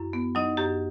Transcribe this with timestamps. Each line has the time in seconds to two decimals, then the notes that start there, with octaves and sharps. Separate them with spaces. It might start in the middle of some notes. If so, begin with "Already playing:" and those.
Already playing: F#2 E4
0.13 B3
0.35 F#3 D#4 D#5
0.57 F#2 G4